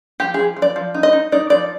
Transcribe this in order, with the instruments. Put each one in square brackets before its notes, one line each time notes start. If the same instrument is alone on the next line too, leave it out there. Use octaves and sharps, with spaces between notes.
[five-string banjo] F3 G4
F3 G#4
F3
D5
F3
D#4
D#5
D#4
D#4 D5
F3 D5